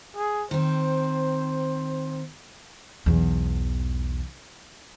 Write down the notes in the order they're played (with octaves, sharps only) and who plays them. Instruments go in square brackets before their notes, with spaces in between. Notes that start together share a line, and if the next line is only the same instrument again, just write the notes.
[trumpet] G#4
[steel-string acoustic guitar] D#3 C4 [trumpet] C5
[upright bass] B1 E2